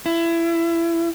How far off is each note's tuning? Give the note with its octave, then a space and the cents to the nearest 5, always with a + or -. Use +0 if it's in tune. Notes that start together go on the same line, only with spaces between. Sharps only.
E4 +25